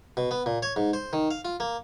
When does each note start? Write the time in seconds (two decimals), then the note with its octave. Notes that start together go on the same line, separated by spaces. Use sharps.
0.17 B2
0.31 B3
0.46 A#2
0.62 C#5
0.76 G#2
0.93 C5
1.13 D#3
1.31 F5
1.45 F4
1.60 A#3